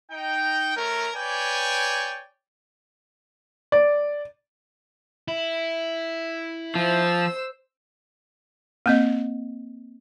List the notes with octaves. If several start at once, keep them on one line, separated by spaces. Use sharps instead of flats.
D#4 G5
A3 C#4 A#4
B4 C#5 D5 G5 G#5
D5
E4
F3 C5 E6
A#3 C4 D#5